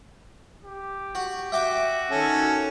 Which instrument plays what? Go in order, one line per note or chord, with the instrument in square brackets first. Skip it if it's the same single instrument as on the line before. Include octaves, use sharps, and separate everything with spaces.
[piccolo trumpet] G4
[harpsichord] F#4
[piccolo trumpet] F#4 [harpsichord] E5 G5 D6
[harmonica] D#3 C#4 A4